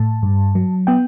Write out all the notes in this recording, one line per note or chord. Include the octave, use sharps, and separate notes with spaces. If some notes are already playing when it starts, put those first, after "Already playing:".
Already playing: A2 A5
G2
F#3
B3 G5